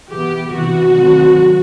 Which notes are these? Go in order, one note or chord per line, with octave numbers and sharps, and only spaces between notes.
E3 B3 G4
C3 E3 B3 F#4
C3 D#3 F#3 A3 C4